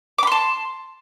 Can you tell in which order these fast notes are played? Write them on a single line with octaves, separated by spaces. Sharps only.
D6 B5 C6 A5